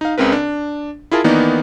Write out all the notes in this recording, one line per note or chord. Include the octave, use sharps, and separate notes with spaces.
D#4 F5
C#2 C#3 C4 A#4 B4
D4
E4 F4 G#4 A#4 A5
D#3 E3 A#3 B3 D#4 D5